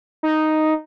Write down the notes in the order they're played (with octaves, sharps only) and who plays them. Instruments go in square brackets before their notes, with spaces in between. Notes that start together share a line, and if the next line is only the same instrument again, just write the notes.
[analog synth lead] D#4